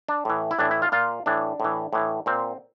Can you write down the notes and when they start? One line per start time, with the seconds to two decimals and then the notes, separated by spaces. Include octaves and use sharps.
0.09 D4
0.25 A2 E3
0.51 E4
0.59 A2 E3 D4
0.71 E4
0.82 F4
0.92 A#2 F4
1.26 A2 E3 D4
1.60 A2 E3
1.93 A2 E3
2.26 A#2 C4